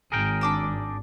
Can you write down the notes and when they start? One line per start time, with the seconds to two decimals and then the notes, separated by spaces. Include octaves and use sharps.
0.12 G#1 G#4 A#4 G5
0.41 D4 D6 E6